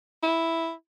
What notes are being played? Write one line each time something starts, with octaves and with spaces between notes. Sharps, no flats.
E4